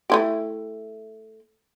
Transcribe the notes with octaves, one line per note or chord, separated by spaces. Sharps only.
A3 E4 G4